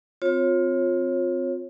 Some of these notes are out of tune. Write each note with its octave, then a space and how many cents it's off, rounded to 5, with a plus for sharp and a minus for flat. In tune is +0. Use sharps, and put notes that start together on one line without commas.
C4 -15 F4 +25 C#5 -30